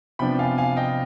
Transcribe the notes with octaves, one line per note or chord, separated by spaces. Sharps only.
C3 F3 B3 D4 G5 B5
F5 G#5
F5 G#5
D#5 G5